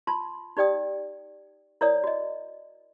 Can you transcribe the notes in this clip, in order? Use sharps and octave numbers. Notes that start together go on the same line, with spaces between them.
F4 A5 C6
D#4 G4 D5 G5 D#6
E4 A#4 C#5 D5 F5 D#6
F#4 D#5